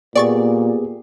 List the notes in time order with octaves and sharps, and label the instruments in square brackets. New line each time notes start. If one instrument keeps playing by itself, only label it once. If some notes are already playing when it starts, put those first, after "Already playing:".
[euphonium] A#2 [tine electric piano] B3 G4 G#4 [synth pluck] D5 C#6 A6